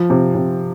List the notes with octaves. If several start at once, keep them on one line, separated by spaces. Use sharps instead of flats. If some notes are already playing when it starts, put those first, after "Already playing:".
Already playing: F3
C3
C3